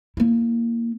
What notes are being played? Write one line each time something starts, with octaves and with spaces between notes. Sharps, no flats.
A#3 E4